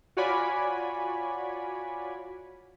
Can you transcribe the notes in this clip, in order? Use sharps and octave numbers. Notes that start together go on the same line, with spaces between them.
F4 F#4 C#5 D5 G#5 B5